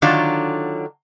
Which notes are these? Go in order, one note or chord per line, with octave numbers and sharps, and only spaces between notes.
D3 D#3 F#3 D4 F4